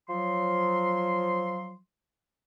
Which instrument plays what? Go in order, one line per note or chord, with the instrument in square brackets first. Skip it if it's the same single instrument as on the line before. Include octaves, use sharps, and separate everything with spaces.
[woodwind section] F3 F#3 C6